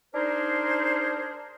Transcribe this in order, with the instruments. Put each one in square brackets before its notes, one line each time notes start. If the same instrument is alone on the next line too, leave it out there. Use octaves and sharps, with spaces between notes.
[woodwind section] D4 D#4 G#4 A#4 C5